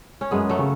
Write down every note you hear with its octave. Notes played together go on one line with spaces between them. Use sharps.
C#4
F#2 G#3 B3
F#3 A3
C#3